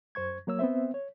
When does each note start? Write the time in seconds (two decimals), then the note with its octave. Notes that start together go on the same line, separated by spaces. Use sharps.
0.15 F#2 C5 C#6 G#6
0.47 F#3 A#3 C#5 E6
0.59 B3 C4 C5 E5
0.94 C#5